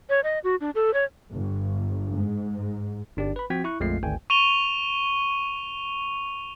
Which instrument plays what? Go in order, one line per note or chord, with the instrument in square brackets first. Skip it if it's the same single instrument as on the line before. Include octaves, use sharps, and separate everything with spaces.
[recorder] C#5
D#5
F#4
D4
A4
C#5
[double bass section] G1
G#2
[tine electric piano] G1 D4 G4 D5
B4 B5
F3 C4 F#4 G5 G#6 B6
E4 C#6 F#6
A#1 F2 G#3 A3 F4 C7
G#1 D2 G5 G#5
[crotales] C#6 D#7 F7 G7